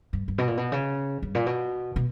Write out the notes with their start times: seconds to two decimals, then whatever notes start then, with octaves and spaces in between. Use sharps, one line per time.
0.13 G2
0.28 G2
0.38 B2
0.48 A#2
0.57 B2
0.72 C#3
1.23 G2
1.35 A#2
1.46 B2
1.96 B2